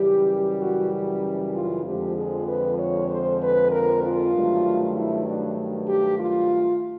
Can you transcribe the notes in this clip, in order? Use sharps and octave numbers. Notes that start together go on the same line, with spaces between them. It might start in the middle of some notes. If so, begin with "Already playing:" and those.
Already playing: F#2 C#3 E3 G3 G4
F#4
F4
F2 D3 F3 G#3 G4
G#4
B4
C#5
C5
B4
A#4
F4
G2 D#3 F#3 A3
E4
D4
G4
F4